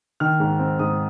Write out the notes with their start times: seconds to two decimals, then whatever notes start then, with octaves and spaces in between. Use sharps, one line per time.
0.20 D#3 F6
0.40 G#2
0.59 C4
0.79 G#2 D#6